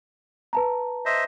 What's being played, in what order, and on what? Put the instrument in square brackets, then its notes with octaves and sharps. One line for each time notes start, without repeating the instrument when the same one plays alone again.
[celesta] B4 A5 A#5
[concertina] C5 D#5 E5